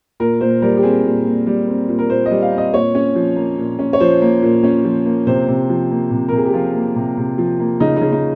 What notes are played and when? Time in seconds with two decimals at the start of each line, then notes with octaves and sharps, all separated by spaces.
0.20 A#2 A#4
0.41 A#2 C5
0.62 G3 A#4
0.77 G4
0.83 C4 G#4
1.05 A#2
1.26 A#2
1.47 G3
1.68 C4
1.89 A#2
1.99 A#4
2.10 A#2 C5
2.26 D#5
2.31 G3
2.42 F5
2.52 C4
2.58 D#5
2.73 A#2 C#5
2.95 C#4
3.15 F3
3.36 A#3
3.58 A#2
3.79 C#4
3.93 C#5
4.00 F3 C5
4.21 A#3
4.42 A#2
4.64 C#4
4.85 F3
5.06 A#3
5.27 C3 C5
5.48 C3
5.69 F3
5.91 A#3
6.11 C3
6.29 A#4
6.32 C3
6.37 G#4
6.46 G4
6.54 F3 F4
6.75 A#3
6.96 C3
7.17 C3
7.38 F3
7.60 A#3
7.80 C#3 D#4
7.96 D#4
8.02 C#3
8.12 D#4